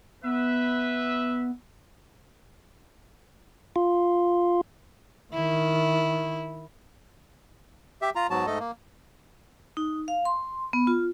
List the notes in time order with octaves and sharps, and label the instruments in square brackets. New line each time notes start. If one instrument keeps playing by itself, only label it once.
[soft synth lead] B3 [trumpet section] B4 E5
[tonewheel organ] F4
[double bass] D#3 [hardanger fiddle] E4
[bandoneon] G4 E5
F4 A#5
G#2 F#3 B3 F#4 A5
G#2 A3 A4 D#5
A#3
[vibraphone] D#4
F5
C6
B3
F4